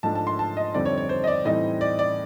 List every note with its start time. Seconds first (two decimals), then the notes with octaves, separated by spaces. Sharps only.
0.03 G#2 F3 A3 D4 A5
0.15 A5
0.27 C6
0.39 A5
0.57 D#5
0.74 F2 D3 G3 C4 D#4 D5
0.86 C#5
0.97 C#5
1.09 C5
1.24 D#5
1.27 D5
1.45 A2 E3 G3 C4 D#4 D#5
1.81 D5
1.99 D5